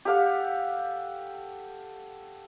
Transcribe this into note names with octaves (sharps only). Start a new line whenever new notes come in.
G4 A4 F5 F#5